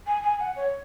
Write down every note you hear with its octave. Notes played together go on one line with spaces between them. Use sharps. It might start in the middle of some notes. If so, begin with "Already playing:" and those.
G#5
G#5
F#5
C#5